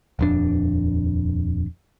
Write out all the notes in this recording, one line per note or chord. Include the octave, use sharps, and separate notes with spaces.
D#1 F2 D4